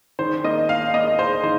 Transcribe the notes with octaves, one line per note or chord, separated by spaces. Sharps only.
D#3 C5
A#3 D#5
D#2 F5
A#3 D#5
D#2 C5
D#3 C5